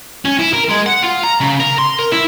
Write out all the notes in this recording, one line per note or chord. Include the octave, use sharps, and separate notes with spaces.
C#4
E4
A#4
G#3
F#5
F4
A#5
C#3
A#4
C6
A#4
E4